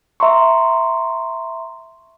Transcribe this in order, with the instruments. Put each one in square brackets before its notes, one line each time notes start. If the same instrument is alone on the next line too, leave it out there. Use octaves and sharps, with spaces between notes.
[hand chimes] E5 A#5 C6 C#6